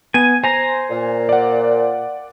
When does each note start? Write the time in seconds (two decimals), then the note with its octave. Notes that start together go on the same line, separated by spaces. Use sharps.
0.14 B3 G#5 D#7
0.44 C5 G#5 A#5
0.91 A#2
1.29 D5 F#5